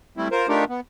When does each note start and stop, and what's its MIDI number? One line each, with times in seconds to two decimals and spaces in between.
0.17 0.28 55
0.17 0.28 57
0.17 0.28 60
0.17 0.28 64
0.31 0.48 65
0.31 0.48 70
0.31 0.48 72
0.48 0.65 57
0.48 0.65 62
0.48 0.65 63
0.48 0.65 65
0.48 0.65 67
0.48 0.65 70
0.69 0.80 59